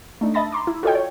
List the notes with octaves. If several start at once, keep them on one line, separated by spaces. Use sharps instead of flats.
A3 D4 D#4
D#5 E5 A5 B5 A6 A#6
A#5 C6 D6
E4
F4 F#4 A4 C#5 D#5 G5
C#5